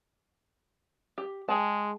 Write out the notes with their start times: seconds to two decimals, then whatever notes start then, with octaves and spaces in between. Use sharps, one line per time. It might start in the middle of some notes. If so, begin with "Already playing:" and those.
1.18 G4
1.49 G#3 G#4 G5 A5